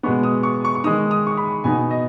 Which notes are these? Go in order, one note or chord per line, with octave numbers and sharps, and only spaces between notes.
B2 G#3 B3 C#6
D#6
C#6
C#6
C#6
D#3 G#3 D#4 D#6
D#6
C#6
B5
B2 B3 D#4 G#5
D#5